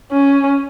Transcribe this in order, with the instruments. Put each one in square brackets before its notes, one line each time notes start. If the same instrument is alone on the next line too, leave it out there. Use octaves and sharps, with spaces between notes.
[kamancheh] C#4